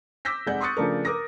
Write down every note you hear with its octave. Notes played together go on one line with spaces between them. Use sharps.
D6 E6 G6 A#6 B6
F1 G#3 D5 F#5 G6
C6 C#6 D#6 F#6 A6 C#7
C#3 F3 A3 D4 A#4
A#4 D6 D#6 A#6